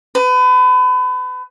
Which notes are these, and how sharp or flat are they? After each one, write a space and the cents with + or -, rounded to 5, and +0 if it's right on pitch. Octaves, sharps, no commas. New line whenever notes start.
B4 +35